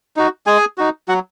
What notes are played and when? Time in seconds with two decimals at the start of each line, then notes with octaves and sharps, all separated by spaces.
0.16 D#4 F#4
0.46 G#3 G#4 G#5
0.78 D#4 F#4
1.08 F#3 F#4 F#5